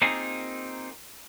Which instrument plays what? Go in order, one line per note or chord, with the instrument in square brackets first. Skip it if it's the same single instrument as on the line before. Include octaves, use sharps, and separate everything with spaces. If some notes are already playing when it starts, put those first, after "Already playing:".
[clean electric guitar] A#3 C4 D#4 F4 G#4